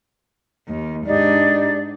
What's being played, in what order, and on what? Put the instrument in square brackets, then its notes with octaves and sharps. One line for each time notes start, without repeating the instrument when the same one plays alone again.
[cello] D#2
[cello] G#2 D4 [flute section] D#4 G4 D5